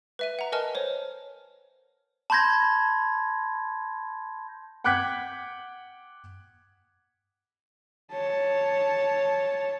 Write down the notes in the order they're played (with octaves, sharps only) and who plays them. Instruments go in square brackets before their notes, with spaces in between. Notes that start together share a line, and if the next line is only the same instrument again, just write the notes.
[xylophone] B4 E5 D#7
F#5 A#5
A#4 B4 D#5 G#5 A5 F6
C5 C#5
[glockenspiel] A5 B5 C6 G6 G#6 A#6
[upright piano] F#5 G5 D6 F#6 G#6 B6
[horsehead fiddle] C#5 A5